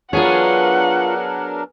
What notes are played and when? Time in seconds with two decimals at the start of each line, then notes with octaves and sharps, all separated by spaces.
0.13 F#3 B3 D4 F4 G#4 A#4 C#5 F#5